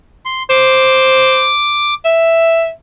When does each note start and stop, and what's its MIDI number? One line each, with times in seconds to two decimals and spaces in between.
0.26 0.43 84
0.50 1.50 72
0.50 1.94 86
2.05 2.71 76